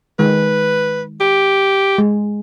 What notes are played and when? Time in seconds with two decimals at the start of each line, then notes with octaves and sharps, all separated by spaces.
0.19 D#3 G#3 B4
1.21 G4
1.98 G#3